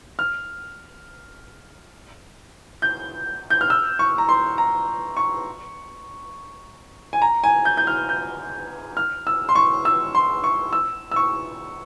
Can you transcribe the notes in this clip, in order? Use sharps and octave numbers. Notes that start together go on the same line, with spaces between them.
F6
G6
G6
F6
E6
C#6
A#5
C6
A#5
C#6
G#5
A#5
G#5
G6
G6
F6
G6
F6
E6
C6
C#6
E6
C6
C#6
E6
E6
C#6